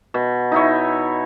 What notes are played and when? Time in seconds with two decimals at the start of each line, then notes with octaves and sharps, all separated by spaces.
0.14 B2
0.52 D#4 E4 C#5